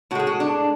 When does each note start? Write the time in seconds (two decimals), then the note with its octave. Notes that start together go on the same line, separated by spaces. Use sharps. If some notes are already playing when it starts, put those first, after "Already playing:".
0.11 A2 F#4
0.15 G#3 G#4
0.27 F#4
0.40 D4